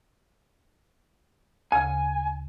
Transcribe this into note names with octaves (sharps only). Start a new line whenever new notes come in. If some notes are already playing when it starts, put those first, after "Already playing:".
D2 C#3 G#5